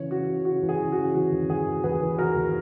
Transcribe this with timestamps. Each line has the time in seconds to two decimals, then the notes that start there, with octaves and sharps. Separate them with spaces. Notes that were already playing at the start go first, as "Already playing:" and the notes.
Already playing: C#3 E3 C#5
0.11 C#3 F#4
0.29 C#3
0.45 C#3 F#4
0.63 E3
0.69 G#4
0.80 E3
0.92 F#4
0.98 C#3
1.14 E3 F#4
1.32 D#2
1.50 D#2 G#4
1.67 D#2
1.84 E3 G#4 B4
2.01 E3
2.18 E3 F#4 A#4
2.36 D#2